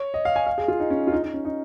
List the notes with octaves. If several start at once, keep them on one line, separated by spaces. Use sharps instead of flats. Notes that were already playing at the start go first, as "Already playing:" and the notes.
Already playing: C#5
D#5
F5
G#5
F5
G#4
F4
D#4
C#4
F4
D#4
D#4
C#4
D#4